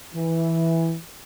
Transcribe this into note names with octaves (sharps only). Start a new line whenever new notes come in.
E3